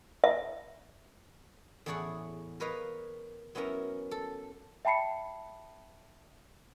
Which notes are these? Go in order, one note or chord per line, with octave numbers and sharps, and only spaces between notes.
E5
E2 A2 E4 G#4 C#5 F#5
A#4 B4 C#5 D#5 F5
F#3 B3 C#4 E4 A#4
A4
E5 G5 A5 B5 C7 C#7